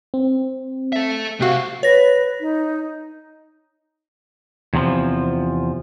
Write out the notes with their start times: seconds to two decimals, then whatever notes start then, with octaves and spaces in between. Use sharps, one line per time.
0.14 C4
0.93 A4 E5
1.40 C3 A3 F#4 F5
1.83 B4 C#5 A#6
2.40 D#4
4.74 E2 C3 D#3 F3